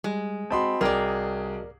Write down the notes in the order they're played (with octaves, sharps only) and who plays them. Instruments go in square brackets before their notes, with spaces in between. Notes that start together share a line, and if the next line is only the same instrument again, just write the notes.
[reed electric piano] G3 [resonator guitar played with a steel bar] G#3
[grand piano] C4 B5 C6 [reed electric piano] F#4 D#5 A5
[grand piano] C2 G#4 G5 [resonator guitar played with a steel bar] A#4 D5